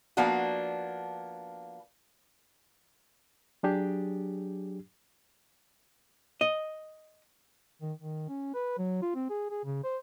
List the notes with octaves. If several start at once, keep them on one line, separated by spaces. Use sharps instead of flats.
F3 A#3 B3 D4 F#4
F#3 D4 G4 G#4
D#5
D#3
D#3
C#4
B4
F#3
F4
C4
G#4
G#4
C#3
C5